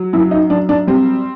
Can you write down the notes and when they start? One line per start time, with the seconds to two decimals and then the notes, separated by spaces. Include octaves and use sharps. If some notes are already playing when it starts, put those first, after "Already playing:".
Already playing: F#3
0.13 F#2 E4
0.31 D#4
0.50 F#2 D4
0.69 D4
0.87 G3 C4